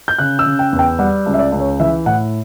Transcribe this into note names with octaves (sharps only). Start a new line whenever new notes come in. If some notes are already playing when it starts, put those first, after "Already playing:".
G6
C#3 F#6
E6
C#3
G5
E2
G5
G3 F#5
C#2
E5
D5
C#2
C#5
E3 E5
A2 F#5